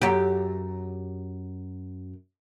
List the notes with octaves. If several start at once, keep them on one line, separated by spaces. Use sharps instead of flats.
F#2 G4